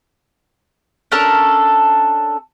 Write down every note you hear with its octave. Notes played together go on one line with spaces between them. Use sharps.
C#4 D4 A4 A#4